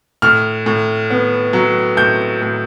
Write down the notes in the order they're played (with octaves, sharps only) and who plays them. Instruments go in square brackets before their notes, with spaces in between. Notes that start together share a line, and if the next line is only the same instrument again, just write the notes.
[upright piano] A2 F6
A2
B3
F#3
A2 G6
A2